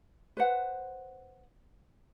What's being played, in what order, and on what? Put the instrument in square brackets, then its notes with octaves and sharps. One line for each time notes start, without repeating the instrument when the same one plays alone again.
[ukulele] B4 C5 F#5